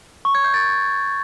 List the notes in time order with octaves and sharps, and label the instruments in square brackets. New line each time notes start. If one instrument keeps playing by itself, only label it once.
[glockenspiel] C#6
G#6
G6
A6